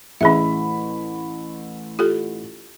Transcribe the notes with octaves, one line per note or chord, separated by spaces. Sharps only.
A1 C#4 E4 G#4 E5 B5
F4 G4 A4